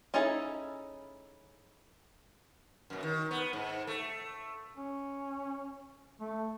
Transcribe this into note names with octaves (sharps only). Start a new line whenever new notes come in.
C#4 D#4 E4 G#4 A4
F#2 B2
D#3
B3
G#2
A3
C#4
A3